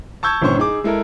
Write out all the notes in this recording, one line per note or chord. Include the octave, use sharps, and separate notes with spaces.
A5 C#6 E6 G6 G#6
G1 A#2 D#3 C#4 C5 C#6
D#4 G#4 D6
G#3 E4 A4 A#4